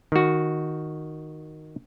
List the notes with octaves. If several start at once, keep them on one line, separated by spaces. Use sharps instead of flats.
D#3 F#4